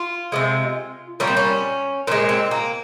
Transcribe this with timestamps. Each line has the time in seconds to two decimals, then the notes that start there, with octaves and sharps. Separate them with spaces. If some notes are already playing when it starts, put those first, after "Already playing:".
Already playing: F4
0.32 C3 D#3 G#3
1.20 A#2 G3 A#3 C#4
1.27 C4
1.37 C#4
2.07 A#2 G#3 C4
2.29 C4
2.51 A#3